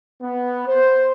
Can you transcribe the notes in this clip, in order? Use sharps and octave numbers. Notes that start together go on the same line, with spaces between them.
B3
C5